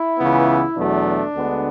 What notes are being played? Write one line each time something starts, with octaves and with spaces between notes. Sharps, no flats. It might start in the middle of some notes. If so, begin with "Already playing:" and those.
Already playing: E4
C#2 C#3 E3 B3
E2 B2 F#3 A3 D4
D2 D3 G#3 B3